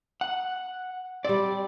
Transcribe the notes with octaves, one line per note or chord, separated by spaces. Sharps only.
F#5
G3 C4 D5